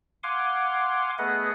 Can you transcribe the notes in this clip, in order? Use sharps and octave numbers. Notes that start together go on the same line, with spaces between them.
F5 F#5 G#5 C6 D6
A3 B3 G#4 B4 D#5 F#5